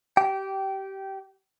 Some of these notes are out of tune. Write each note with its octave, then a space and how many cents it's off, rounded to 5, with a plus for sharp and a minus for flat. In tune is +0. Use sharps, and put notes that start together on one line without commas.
G4 -20 G5 -15